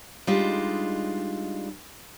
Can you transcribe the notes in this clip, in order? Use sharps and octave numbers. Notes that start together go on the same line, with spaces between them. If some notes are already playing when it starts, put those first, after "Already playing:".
G3 G#3 D4 D#4 F4